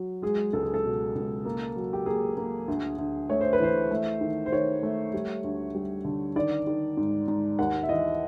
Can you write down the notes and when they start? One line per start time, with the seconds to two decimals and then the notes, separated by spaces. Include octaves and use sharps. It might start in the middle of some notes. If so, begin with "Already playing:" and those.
Already playing: F#3
0.22 G#3 G#4
0.53 C#2 A4
0.63 G#4
0.74 A4
0.85 B2
1.15 C#2
1.45 A#3
1.76 F#3
1.93 G4
2.06 A#3 G#4
2.37 A#3
2.68 D2
2.98 D2
3.30 A3 C#5
3.41 C5
3.53 B4
3.60 E3 C5
3.91 A3
4.21 D#3
4.46 C5
4.52 D#3 C#5
4.83 A3
5.14 G3
5.44 D2
5.75 G3
6.05 D3
6.36 D#3 D5
6.67 D#3
6.97 G#2
7.28 G#2
7.59 D#2 F#5
7.83 E5
7.89 E3 D#5